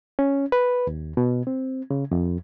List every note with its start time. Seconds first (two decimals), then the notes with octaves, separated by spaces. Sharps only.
0.19 C#4
0.52 B4
0.87 D#2
1.17 B2
1.47 C4
1.91 C#3
2.11 F2